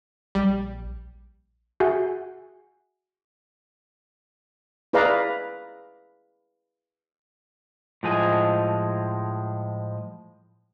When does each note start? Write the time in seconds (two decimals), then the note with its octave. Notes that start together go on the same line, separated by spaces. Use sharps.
0.35 A#1 G3
1.80 F#4 G#4 E5 F#5 G#5
4.93 E4 G#4 B4 D5 F5 A#5
8.03 A2 F3 G#3 G#5